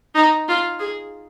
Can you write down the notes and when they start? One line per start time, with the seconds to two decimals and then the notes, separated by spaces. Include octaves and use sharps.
0.15 D#4
0.48 F4
0.79 G#4